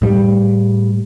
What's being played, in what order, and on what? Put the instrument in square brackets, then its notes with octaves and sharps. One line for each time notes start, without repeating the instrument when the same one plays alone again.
[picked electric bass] A2 G3